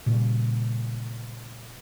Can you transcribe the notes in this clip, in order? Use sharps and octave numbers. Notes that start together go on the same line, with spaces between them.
A#2 C#3 G3